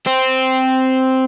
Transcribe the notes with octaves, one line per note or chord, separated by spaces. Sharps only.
C4